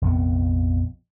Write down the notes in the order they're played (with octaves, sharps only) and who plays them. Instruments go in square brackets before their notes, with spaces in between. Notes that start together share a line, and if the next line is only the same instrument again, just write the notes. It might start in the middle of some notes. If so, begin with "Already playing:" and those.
[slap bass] A#1 F2 C3 B3